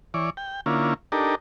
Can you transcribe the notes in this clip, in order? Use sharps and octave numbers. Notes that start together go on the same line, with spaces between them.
E3 C#5 D5
G5
D3 A#3 C#4 E4 F4
D4 D#4 G4 A4 A#4